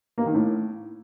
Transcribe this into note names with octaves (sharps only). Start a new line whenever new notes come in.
A#3
D#3
A2